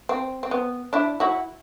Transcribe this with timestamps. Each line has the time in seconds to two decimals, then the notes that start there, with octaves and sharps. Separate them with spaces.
0.09 C4
0.43 C4
0.51 B3
0.93 D4 E4
1.20 E4 F#4